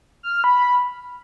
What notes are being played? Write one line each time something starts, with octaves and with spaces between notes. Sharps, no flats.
F6
F6
B5